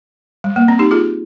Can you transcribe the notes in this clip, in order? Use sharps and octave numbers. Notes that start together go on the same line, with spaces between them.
G3
A#3
C4
D#4 G4
F4 G#4